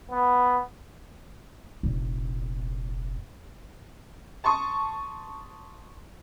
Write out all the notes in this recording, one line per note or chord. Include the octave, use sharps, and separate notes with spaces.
B3
F1 A#1
A5 C6 C#6 D#6